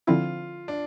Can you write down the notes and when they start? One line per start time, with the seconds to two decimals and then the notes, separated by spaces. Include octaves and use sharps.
0.07 D3 F3 C4 E4 F4
0.68 D4